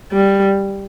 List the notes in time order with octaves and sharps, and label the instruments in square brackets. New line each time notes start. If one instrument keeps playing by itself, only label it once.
[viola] G3